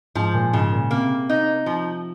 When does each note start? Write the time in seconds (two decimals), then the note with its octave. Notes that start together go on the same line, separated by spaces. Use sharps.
0.15 G#2 F3
0.34 A#2
0.53 G#2 C#3
0.72 A#2
0.91 C3 A#3
1.29 D#4
1.66 F3